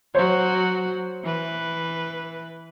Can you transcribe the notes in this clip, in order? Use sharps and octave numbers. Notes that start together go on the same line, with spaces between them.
F#3 F#4 C5 C#5
E3 B4